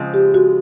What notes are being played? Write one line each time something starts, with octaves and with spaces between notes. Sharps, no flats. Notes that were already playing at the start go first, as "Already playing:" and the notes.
Already playing: C#3 F3 G#3 C4
G4
F#4